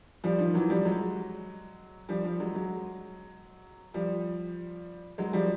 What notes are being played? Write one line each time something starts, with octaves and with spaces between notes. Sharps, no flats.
F3 G3
D#3 F3
E3 F#3
F3 G3
F#3 G#3
F3 G3
F3 G3
F#3 G#3
F#3 G#3
F3 G3
F#3 G#3
F3 G3